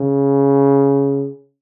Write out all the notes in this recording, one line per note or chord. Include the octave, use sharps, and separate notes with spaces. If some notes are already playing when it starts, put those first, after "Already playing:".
Already playing: C#3